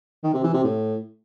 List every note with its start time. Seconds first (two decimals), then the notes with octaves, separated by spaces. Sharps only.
0.24 D#3
0.34 C3
0.44 E3
0.54 C3
0.64 A2